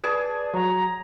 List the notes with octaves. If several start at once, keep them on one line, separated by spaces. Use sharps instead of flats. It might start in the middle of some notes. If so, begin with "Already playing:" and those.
G#4 B4 D5 A5
F#3 F#4 A#5